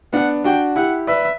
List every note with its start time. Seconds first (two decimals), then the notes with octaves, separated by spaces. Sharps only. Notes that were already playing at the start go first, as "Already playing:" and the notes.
0.13 B3 D4 F#5
0.44 D4 F#4 G5
0.76 E4 G4 F#5
1.07 B4 D5 E5